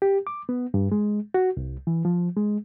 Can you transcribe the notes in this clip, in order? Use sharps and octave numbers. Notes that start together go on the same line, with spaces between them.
G4
D6
B3
G2
G#3
F#4
C2
E3
F3
G#3